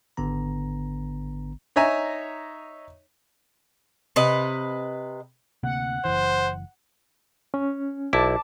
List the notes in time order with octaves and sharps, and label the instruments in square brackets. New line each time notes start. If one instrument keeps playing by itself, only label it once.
[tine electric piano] G#1 D3 B3 A#5
[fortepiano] D#4 C#5 E5 G#5 A#5
[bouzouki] C3 B4 D#5
[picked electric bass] D2 C3 A#3 [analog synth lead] F#5
[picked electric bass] F#1 E3 [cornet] C5
[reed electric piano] C#4
[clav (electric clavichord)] B1 E4 [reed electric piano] A5 D6